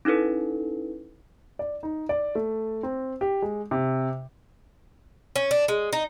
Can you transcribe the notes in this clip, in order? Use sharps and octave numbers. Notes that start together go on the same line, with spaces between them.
C#4 D#4 E4 A4 B4
D5
D#4
D5
A3
C4
G4
G#3
C3
C#4
D4
G#3
D#4